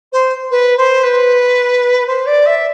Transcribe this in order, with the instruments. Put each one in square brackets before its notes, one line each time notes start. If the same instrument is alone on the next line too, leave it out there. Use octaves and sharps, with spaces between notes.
[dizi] C5
B4
C5
B4
C5
D5
E5